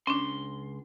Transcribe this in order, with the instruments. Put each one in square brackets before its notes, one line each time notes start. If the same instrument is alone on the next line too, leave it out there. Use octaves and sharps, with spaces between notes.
[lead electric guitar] C#2 C6 [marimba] C#4 D4